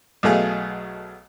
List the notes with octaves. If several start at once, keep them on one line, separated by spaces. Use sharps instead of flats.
B1 B2 A3 G#4 F5